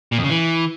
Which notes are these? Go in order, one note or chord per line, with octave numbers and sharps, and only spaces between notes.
A#2
F2
C#3
E3